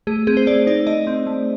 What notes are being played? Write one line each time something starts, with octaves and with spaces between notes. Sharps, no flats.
A3 G#4
C4 G#4
C5
A3 D5
D#4 D5
A3 D#5
C4
A3